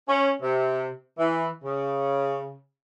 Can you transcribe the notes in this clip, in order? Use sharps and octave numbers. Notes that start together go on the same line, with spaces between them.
C#4
C3
E3
C#3